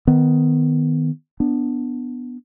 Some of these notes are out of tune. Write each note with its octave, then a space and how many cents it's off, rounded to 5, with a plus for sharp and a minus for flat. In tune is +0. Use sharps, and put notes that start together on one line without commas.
D#3 +0 B3 +15
B3 +0 D4 +0